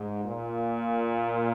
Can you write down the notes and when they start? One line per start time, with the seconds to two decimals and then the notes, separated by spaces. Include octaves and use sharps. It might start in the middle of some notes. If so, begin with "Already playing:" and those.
Already playing: G#2
0.25 A#2